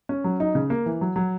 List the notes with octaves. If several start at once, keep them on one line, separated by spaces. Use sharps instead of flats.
C#4
F#3
D#4
C#3
A#3
E3
F#3
F#3